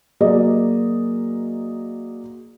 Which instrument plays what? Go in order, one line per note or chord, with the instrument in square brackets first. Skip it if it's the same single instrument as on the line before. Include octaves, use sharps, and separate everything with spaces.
[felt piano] F#3 A#3 G#4 D5 D#5